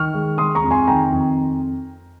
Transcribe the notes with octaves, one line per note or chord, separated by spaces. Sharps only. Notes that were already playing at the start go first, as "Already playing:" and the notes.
Already playing: D#3 C#6 F6
G#3
G#3 C6 D#6
A#5 C#6
F2
G#5 C6
D#3 G5 A#5
F2